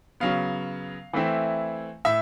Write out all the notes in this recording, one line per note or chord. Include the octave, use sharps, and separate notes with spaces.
C#3 F#3 B3 F5
E3 A3 C4 E4
A2 E5